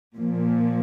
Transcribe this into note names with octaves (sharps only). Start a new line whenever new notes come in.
A#2 F3